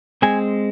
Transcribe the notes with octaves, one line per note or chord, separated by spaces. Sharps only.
G#3 C4 G#5